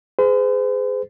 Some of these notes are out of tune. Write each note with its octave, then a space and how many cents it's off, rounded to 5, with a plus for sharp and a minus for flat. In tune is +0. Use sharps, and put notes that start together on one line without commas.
G#4 +0 C5 -45